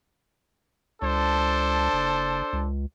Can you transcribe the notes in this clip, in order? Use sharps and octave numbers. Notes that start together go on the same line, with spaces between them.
C#2 D4 A4 C5
F#1
C#2